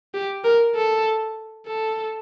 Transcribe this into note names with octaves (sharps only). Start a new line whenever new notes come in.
G4
A#4
A4
A4